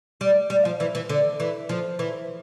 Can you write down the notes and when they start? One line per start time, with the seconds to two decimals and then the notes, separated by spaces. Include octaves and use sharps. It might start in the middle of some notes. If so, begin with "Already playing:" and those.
0.21 G3
0.50 G3
0.65 F3
0.80 E3
0.95 E3
1.09 D3
1.40 E3
1.69 F3
1.99 E3